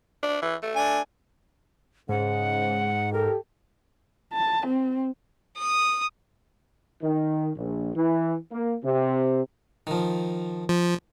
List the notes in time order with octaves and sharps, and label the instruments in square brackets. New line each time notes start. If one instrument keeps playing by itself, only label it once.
[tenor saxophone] D4
E3
A3
[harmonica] D4 G#5
[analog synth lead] G#2 [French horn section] C#3 G#3 [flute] F#5
[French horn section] G4 A4 [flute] A#4
[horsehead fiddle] A5
C4
[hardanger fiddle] D#6
[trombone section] D#3
A#1
E3
A#3
C3
[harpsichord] D#3 F3
[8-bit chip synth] F3